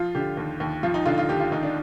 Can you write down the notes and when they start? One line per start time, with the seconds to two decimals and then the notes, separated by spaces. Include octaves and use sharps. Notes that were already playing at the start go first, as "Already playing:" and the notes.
Already playing: F3 F4
0.15 D3 G4
0.37 D#2
0.60 D#2
0.83 F3 F4
0.94 D#4
1.05 D3 F4
1.18 F4
1.29 D#2 G4
1.40 F4
1.52 D#2 D#4
1.63 D4